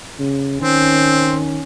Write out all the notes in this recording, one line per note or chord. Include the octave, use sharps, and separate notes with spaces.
C#3
D#3 C4 C#4